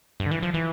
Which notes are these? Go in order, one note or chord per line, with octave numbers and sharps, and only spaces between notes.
G2
D3
E3
F3
E3